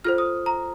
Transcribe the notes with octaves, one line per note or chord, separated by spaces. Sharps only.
F4 A4 C5 F6
D#6
A#5